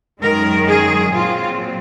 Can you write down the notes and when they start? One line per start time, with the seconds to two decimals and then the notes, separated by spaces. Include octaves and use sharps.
0.21 F#2 D#3 G#3 A#4
0.66 G#4
1.12 A#2 F#3 C4 F4